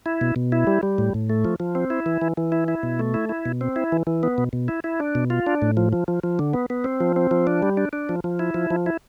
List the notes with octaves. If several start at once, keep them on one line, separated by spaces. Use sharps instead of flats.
E4
B2
B2
E4
G3
G3
A2
A2
A3
F3
F3
C4
E4
E3
E3
E3
E4
E4
B2
A3
E4
E4
B2
C4
E4
E3
E3
B3
B2
B2
E4
E4
D4
B2
F4
D4
A2
F3
F3
F3
F3
D3
B3
B3
C4
F3
C4
F3
D4
G3
D4
D4
F3
F3
E4
F3
F3
E4